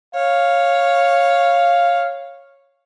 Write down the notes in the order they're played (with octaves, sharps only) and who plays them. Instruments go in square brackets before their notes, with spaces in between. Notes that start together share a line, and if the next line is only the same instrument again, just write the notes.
[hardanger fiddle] C#5 [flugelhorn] F5